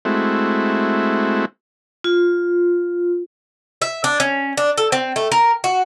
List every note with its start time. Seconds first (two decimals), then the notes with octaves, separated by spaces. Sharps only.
0.05 G#3 A3 C4 E4 F#4
2.04 F4
3.82 E5
4.04 D4
4.20 C#4
4.57 D4
4.78 A4
4.92 C4
5.16 A3
5.32 A#4
5.64 F#4